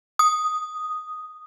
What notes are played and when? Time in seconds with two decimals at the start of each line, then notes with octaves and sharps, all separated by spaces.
0.19 D#6